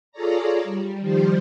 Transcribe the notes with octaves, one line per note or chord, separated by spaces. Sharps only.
F4 G#4 A4 C#5 D5 A#5
G3
D#3 F3 G3 G4 C5